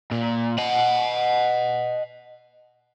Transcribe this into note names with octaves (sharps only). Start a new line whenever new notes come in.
A#2
D#5 F#5